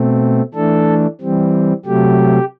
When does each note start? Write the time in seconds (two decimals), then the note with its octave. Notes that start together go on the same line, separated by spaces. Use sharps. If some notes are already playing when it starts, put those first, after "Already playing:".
Already playing: B2 A3 C4
0.54 E3 A3 D4 A4
1.21 E3 G3 C4
1.85 C3 F#3 A3 G4